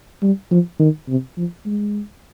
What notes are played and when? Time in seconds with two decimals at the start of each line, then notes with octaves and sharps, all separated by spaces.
0.22 G3
0.51 F3
0.80 D#3
1.09 C3
1.37 F3
1.66 G#3